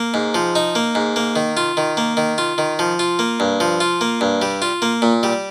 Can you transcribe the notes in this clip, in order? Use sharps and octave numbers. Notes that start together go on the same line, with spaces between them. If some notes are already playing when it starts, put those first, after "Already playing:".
Already playing: A#3
G#2
F3
D#4
A#3
G#2
A#3
D#3
F4
D#3
A#3
D#3
F4
D#3
F3
F4
A#3
G2
F3
F4
A#3
G2
G3
F4
A#3
A#2
G3